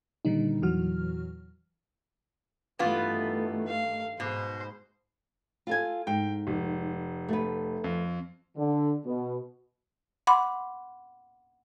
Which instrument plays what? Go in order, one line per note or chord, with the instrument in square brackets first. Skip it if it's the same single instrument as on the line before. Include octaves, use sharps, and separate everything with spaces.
[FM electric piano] A#2 D3 D#3 G3 D#4
E2 A#2 E3 F#3 F#4 F6
[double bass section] G2 D#3 A3 [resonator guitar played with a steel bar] E3 B3 F4
[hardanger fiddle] F5
[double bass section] G#2 [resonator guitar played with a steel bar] B2 [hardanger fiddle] C5
[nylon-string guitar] F4 A4 G#5
[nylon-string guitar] G#2 [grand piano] G5
[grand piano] F1
[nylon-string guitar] A3 B3
[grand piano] F2
[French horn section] D3
B2
[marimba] F#5 B5 C6 D6